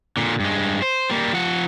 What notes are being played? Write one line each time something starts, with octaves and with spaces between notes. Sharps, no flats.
A#2 D3
G2 G#3
C5
G3 A#3
F3 F#5